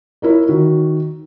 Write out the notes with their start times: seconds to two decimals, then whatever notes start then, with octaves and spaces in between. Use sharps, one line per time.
0.22 E4 A#4 C#5
0.49 D#3 F#4